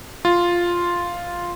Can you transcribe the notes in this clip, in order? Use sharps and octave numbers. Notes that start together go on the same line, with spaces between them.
F4